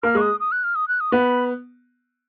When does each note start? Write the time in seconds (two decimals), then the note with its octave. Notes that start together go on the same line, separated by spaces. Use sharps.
0.03 A#3 F6
0.15 G#3 C#6
0.21 D#6
0.40 D#6
0.52 F#6
0.64 F6
0.75 D#6
0.88 F#6
1.00 D#6
1.12 B3 B5